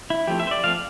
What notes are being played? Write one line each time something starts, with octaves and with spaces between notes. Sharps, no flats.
E4
F3 A3 C4 G4
E5
C5
D5
F3 A3 C4 F5